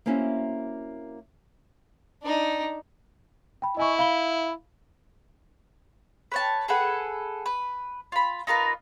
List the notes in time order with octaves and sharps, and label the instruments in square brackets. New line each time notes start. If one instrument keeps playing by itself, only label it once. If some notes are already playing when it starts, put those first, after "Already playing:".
[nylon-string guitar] A#3 C4 C#4 E4 F#4
[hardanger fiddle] D4 D#4
[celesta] G5 B5
[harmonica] E4 [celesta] D#5 G#5 C#6
[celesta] F5 B5 G7
[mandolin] B4 C#5 A5
G#4 A4 B4 F#5
B4
F4 B5
D#4 F4 A#4 B4